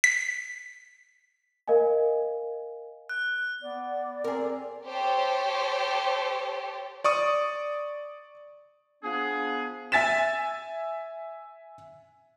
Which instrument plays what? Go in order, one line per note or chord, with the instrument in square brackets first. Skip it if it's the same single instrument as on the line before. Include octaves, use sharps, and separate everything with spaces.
[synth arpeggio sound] B6
[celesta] A#4 D#5 F5 G#5
[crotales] F#6
[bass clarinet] B3 [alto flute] D5
[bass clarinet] C4 [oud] G#4 A#4
[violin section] G4 A4 C5 C#5
[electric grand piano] D5 C#6 D#6
[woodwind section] F3 B3 D4 G#4
[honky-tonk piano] E5 G#5 A6 B6 E7